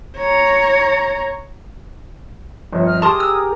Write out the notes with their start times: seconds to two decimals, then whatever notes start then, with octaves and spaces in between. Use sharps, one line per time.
0.18 C#5 A#5
2.72 G1 F2 C#5
2.87 D#5 F6
3.02 G4 G#4 A#4 A5 C6 D6 D#6 F6
3.20 E6